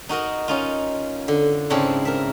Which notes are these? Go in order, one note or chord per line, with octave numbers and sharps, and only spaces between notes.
D#4 F#4 A#4 D#5
C#4 D#4 F4
D3
G#2 C#3 C4 D4 E4
A#4 E5